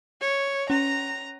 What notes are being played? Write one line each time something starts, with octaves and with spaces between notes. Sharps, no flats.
C#5
C#4 A#5